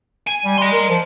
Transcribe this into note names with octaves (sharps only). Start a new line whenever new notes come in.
G#5
G3
G3 D#5 C6
A#4
F3